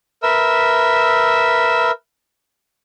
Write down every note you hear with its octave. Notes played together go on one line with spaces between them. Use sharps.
A#4 B4 E5 E6